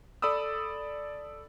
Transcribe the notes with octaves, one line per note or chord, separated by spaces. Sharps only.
A4 D5 B5 D#6 E6